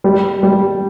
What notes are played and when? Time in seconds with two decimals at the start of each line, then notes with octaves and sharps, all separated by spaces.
0.04 G3
0.43 G3